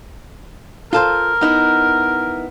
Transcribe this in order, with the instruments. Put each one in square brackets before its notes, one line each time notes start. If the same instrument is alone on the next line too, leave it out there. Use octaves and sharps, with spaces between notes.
[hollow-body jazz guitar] F4 A4 C5 [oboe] A#4
[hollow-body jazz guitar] B3 D#4 E4